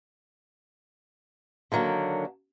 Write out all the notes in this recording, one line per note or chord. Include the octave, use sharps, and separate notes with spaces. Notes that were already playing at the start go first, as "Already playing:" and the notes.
D3 D#3 F#3 A#3